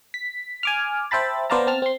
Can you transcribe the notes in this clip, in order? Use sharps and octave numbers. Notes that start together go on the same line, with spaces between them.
B6
G#5 D6 F6
C5 E5 G5 A5 B5 A6
B3 C5 D5 F5 A5 A#5
C4 A5 F6
C4 C6